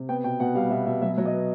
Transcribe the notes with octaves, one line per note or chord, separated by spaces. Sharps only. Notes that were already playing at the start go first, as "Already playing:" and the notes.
Already playing: C3
B3 G5
B2 G5
B2 F#5
G3 F5
B2 E5
B2 E5
F#3 E5
F#3
D#5
B3